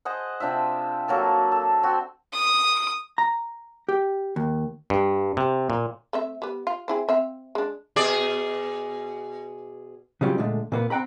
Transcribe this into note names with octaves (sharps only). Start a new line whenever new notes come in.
G#4 C5 D#5 F#5
C3 D4 F4 E5
F#3 A#3 A4
A4
C4 F#4
D#6
A#5
G4
D#2
G2
C3
A#2
A3 C4 E5
G3 B3
F4
C4 E4 G#4
C4 E5 F5
G#3 D4
B2 G#4 D5
C#3 F#3 G3 C#4 F4
A#2 D3 G#3 A3
A#2 A#3 B3
C4 F#5 G5 A#5 B5